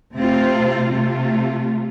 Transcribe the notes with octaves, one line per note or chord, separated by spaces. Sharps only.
C3 A3 C4 F4
C3 A3 F4